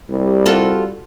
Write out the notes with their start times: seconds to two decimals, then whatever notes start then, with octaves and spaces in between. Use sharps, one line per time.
0.10 C2 G3
0.46 F4 F#4 A4